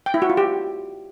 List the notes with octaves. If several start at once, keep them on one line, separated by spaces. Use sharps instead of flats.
G5
E4
F#4
F4
G4